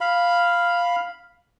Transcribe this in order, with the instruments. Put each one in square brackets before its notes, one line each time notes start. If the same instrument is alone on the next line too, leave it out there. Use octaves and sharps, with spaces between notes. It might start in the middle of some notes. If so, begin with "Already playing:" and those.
[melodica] F5 B5